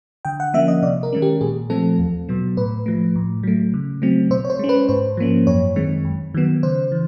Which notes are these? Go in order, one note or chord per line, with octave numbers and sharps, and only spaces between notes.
D3 G5
F#5
F3 A#3 C#4 E5
D#5
C3 D5
A#4
D#3 G#3 C#4
G4
A#2 G#4
F3 A3 C4 A4
E2
B2 F#3 B3
A2 B4
F3 A3
A2
F#3 A3
C#3
F#3 A3 C4
B2 C5
C#5
C5
G#3 C#4
B4
G#2 C5
F3 A#3 C#4
F#2 C#5
D#3 G#3 C4
F#2
D#3 F#3 B3
C#3 C5
E3